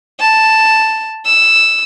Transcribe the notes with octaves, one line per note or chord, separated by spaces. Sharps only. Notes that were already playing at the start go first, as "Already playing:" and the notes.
A5
E6